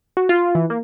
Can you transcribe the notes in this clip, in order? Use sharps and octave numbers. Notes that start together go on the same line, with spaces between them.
F#4
F4
E3
A#3